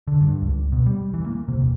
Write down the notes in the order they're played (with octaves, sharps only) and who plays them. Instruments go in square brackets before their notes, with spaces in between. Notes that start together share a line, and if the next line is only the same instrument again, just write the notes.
[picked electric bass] D3
G2
C#2
B2
G3
E3
A#3
C3
E1